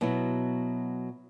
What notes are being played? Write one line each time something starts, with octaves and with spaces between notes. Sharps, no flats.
B2 F#3 B3 E4